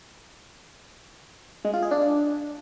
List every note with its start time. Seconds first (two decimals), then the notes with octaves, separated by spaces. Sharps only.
1.65 G#3
1.74 F4
1.82 G#4
1.91 D4